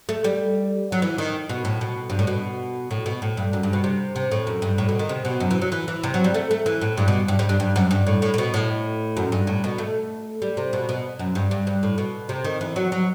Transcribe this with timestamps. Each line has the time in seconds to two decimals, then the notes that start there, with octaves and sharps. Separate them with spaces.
0.09 A3
0.24 G3
0.92 F#3
1.02 E3
1.18 D#3
1.49 B2
1.65 A2
1.81 B2
2.10 G2
2.19 A2
2.27 B2
2.91 A2
3.06 B2
3.22 A2
3.37 G2
3.53 F#2
3.63 G2
3.73 B2
3.84 C3
4.16 C3
4.31 A2
4.47 F#2
4.62 G2
4.78 A2
4.89 B2
4.99 D#3
5.09 C3
5.25 B2
5.40 F#2
5.51 E3
5.62 F#3
5.72 E3
5.88 E3
6.03 C3
6.14 F#3
6.24 G3
6.34 A3
6.51 A3
6.66 E3
6.81 A2
6.97 G2
7.08 B2
7.28 G2
7.39 G2
7.49 G2
7.60 G2
7.76 F#2
7.91 G2
8.07 A2
8.22 A2
8.34 A2
8.38 B2
8.54 A2
9.17 F#2
9.32 G2
9.47 A2
9.64 B2
9.78 A3
10.42 G3
10.57 C3
10.73 B2
10.89 B2
11.19 F#2
11.35 G2
11.51 G2
11.67 G2
11.83 A2
11.98 B2
12.29 C3
12.44 D#3
12.61 E3
12.76 F#3
12.92 F#3